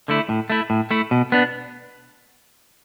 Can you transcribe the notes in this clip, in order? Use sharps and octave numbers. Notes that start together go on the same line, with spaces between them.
D3 A3 E4
A2
A3 E4
A2
A3 E4
B2
B3 D4